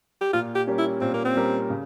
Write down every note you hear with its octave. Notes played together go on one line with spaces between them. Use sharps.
G4
A#2 F4
G4
G3 C#4 G4 A#4
E4
A#2 C4
A#3
C4
G3 C#4 G4 A#4
C#3